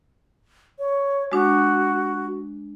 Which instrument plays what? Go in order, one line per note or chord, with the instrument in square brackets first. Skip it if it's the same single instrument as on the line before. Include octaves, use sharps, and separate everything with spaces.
[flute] C#5
[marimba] G#3 D4 [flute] F#4